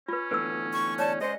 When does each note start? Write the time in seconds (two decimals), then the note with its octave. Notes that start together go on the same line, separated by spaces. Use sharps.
0.08 C#4 F4 B4
0.31 E2 A2 D3 B4 E6
0.73 C#6
0.99 C#5 D5 A5
1.21 G#3 C#4 C5 D#5